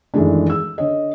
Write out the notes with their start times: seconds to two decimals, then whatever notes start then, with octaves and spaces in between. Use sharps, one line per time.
0.14 F#2 D#3 E3 G#3 A3 D4
0.50 E6
0.78 D3 C#5 D#5